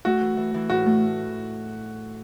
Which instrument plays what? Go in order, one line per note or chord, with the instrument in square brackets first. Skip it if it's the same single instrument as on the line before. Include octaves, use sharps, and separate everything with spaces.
[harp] A3 [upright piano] F#4
[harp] E3
E3
E3
[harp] A2 [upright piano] F#4
[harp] A3